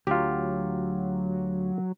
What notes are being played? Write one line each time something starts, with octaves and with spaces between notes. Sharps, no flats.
D2 F#3 F4 G4